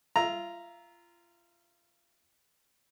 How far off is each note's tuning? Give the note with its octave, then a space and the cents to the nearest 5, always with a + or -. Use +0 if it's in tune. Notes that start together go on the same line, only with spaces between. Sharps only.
F4 -25 E5 +0 A#5 +0